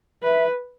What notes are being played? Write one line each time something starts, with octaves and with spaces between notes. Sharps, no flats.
B4 E5